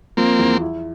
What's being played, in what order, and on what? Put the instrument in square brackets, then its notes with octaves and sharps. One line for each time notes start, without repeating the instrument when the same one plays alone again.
[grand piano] F3 [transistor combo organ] A#3 C4
[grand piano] E2
E4